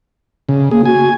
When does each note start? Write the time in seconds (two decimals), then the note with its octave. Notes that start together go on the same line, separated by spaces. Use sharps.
0.49 C#3
0.71 A#3 G#4
0.85 F#4 G#5